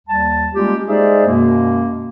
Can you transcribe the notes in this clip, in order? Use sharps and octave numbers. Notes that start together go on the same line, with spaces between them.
D#2 G3 A5
G3 G#3 A#3 C#4 F4 G4
G#3 D#4 G#4 C5 D5 E5
F#2 B2 G#3 A#3